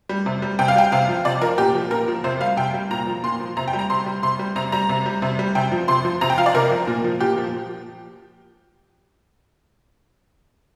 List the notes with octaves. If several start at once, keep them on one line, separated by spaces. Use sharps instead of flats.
G3
C3
G3
C3 G5
F5
G3 G5
C3 F5
F3
C3 D5
F3 A#4
A#2 G4
F3
A#2 A#4
F3
C3 C5
G3 F5
C3 G5
G3
A#2 A#5
F3
A#2 C6
F3
C3 A#5
G5
G3
A#5
C3 C6
G3
C3 C6
G3
C3 A#5
G3 A#5
C3
G3
C3
G3
C3 G5
F3
C3 C6
F3
C3 A#5
G5
F3 F5
D5
C3 A#4
F3
A#2
F3
A#2 G4
F3